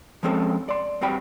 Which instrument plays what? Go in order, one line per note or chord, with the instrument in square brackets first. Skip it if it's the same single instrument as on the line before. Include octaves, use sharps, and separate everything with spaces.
[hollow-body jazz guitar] F3 G#3 C4 C#4 A4
D5 C6
G2 C4 F#4 G5 B5